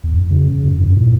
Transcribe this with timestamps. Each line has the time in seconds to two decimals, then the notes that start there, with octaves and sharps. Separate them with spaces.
0.04 E2
0.14 F2
0.31 C#3
0.48 C#3
0.64 F2
0.80 G2
0.97 A#2